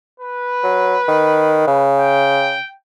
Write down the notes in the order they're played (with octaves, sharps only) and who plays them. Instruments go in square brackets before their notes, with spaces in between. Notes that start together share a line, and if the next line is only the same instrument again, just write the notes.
[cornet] B4
[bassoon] F#3
D#3
C#3
[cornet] G5